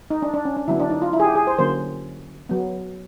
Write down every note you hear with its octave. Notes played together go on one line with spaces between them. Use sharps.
D#4
D4
D4
C#4
D4
D3 F#3 B3 E4
D4
D#4
F4
E4
G#4
G4
G#4
C5
D3 F#3 A#3 C#4 C5
F#3 B3